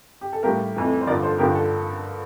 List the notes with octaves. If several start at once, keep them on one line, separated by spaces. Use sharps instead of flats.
G4
A4
A2 G3 A#3 G4 A#4
F2 E3 A3
C5
G2 D3 F3 A#4 D5
A4 C5
G2 D3 F3 A#3 G4 A#4
A4